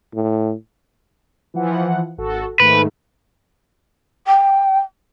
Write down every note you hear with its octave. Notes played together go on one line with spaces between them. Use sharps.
A2
E3 F3 F#5
G#1 F#4 A4
G#2 D#3 A3 B4
G5